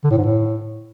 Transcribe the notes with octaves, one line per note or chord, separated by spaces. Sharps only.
D3
A2
G#2
A2